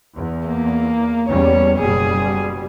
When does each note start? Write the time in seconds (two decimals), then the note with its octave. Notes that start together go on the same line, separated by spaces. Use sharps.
0.15 E2
0.47 A#3
1.29 E2 G3 C#4 C#5
1.78 F#1 B2 G3 G#4